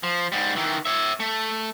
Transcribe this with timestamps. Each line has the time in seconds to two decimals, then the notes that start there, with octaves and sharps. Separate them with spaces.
0.03 F3
0.32 G#2 G3
0.56 D#3 E3
0.86 C#5 E5
1.20 A3